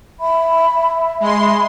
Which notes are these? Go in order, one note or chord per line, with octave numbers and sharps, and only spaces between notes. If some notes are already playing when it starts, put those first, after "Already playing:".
E5 B5
G#3 B5 C6